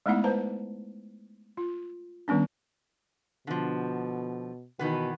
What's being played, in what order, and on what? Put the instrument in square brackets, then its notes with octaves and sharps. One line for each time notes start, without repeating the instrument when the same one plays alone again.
[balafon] G#3 A3 B3 D#4 E4 F#5
B4 C5 A5 A#5
F4
D#3 G3 B3 C#4 D4
[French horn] B2 [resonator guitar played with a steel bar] D3 F3
[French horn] B2 [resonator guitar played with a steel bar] D#3 E3 B3